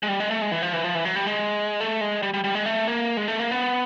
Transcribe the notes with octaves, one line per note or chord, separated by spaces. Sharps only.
G#3
G3
G#3
A3
G#3
E3
F3
E3
F3
E3
F#3
G3
G#3
A3
G#3
G3
G3
G3
G#3
A3
A#3
G#3
A3
A#3
B3